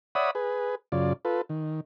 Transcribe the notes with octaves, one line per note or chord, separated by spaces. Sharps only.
C#5 D5 E5 F#5 B5 D#6
G#4 B4
F#2 C#3 F4 D5
F4 A4 B4
D#3